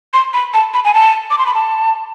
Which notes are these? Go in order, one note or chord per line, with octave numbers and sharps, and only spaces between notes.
C6
B5
A5
B5
G#5
A5
D6
C6
B5
A5